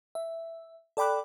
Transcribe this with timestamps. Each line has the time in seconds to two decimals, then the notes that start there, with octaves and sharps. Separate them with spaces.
0.15 E5
0.97 A4 D5 G5 B5 D6 F#6